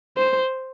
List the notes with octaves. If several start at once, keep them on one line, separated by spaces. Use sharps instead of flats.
C5